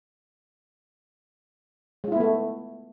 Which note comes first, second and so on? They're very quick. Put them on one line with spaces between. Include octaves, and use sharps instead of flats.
G#3 F4 E4 B3 A3